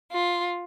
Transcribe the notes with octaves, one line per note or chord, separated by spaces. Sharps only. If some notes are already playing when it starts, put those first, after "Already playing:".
F4